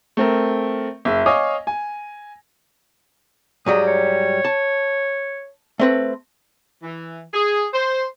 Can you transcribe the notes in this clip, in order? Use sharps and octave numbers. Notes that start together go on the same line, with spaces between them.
A3 C4 A#4
F#1 E5
C#5 D#5 F5 G#5 D6 D#6
G#5
G#2 F#3 G3 D#6
C#5
A5
A3 C4 B4
E3
G#4
C5